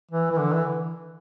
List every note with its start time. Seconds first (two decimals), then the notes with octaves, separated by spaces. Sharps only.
0.11 E3
0.31 E3
0.38 D3
0.53 E3